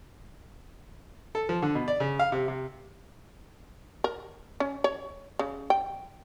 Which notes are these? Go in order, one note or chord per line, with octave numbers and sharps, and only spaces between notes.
A4
F3
D3
B2
D5
C#3
F5
C3
C3
A#4
C#4
C#5
C#3
G5